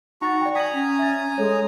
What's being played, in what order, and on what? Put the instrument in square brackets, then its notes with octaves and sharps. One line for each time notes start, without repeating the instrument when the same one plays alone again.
[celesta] D#4 F#5 A6 [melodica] F#4 A#5 C#6
[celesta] D5 G5
[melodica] G#5 A#5 D#6 [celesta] B6 F#7
[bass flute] C#4
[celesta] E5 A6
[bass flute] G#3 [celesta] A4 C#5